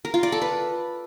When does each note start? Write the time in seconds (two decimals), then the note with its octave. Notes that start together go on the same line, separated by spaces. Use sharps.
0.05 A#4
0.14 F4
0.23 D5
0.32 A4
0.42 B4